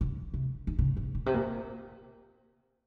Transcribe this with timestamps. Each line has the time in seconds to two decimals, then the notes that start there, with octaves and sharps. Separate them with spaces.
0.01 C3
0.06 C#3
0.34 C3
0.67 D#3
0.79 C#3
0.97 C3
1.15 A#2
1.26 C3
1.34 A#2